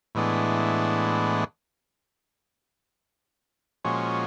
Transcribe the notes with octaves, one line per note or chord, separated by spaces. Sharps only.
A2 E3 G#3 B3 D4
A#2 F3 G#3 C#4 F#4